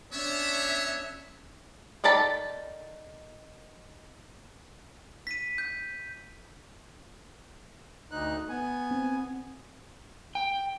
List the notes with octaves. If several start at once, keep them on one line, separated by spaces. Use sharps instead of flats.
B3 C#4 D4 C#5 E5
D#3 A4 D5 A5 B5
B6 D#7
G6
D2 D#4 F#6
B3 G#5
C4
G5